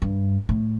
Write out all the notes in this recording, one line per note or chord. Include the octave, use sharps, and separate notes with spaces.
G2
A2